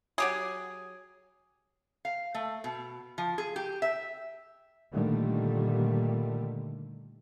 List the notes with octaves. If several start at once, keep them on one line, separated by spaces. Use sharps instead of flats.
F#3 G4 G#4
F5
A3
B2
F3
G#4
G4
E5
A#2 D3 D#3 G3 A3